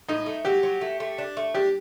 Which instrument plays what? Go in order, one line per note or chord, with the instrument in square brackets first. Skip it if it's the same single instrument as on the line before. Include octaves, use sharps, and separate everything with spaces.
[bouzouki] A2 [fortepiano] D#4
[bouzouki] A3
[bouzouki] F#3 [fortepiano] G4
[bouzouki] F#3
A3
A3
D4
A3
[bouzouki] D4 [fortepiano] G4